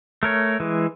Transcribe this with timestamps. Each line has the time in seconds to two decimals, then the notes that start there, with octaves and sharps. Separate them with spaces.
0.23 A3 A#4 C#5
0.60 E3 G#3